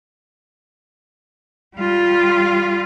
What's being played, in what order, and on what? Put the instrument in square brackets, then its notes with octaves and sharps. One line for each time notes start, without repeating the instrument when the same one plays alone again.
[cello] G3 F4